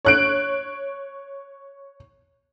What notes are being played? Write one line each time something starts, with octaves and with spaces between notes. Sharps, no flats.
C#5 F#6 D7